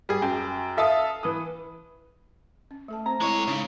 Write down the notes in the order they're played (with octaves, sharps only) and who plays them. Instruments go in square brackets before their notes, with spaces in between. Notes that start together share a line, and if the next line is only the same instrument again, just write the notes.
[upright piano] G3 G#4
F#2 G5
A4 E5 F5 A5 D#6
E3 B4 D#6
[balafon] C#4
A3 A4 A5
[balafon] C4 C5 [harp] A#5
[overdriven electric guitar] G#3 C#5 [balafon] E4 D#5
[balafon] E4 A4
[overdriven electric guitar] C#3 [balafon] G#3 D#4